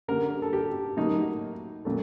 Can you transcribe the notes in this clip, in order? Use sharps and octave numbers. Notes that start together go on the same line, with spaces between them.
D3 G3 A#3 A#4
A4
G4
A2 F#3 A#3 D#4
A#2 F#3 A3